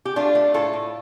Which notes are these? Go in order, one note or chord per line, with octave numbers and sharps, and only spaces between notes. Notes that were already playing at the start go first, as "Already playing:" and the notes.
G4
A3 D4 F4
A3
A2 F4 A4
A2